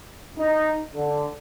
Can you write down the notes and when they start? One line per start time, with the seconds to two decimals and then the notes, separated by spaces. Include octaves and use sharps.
0.38 D#4
0.94 D3